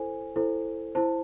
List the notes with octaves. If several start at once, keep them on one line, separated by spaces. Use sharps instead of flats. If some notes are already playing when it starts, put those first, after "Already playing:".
Already playing: E4 A4 C5 G#5
E4 A4 C5
E4 C5 A5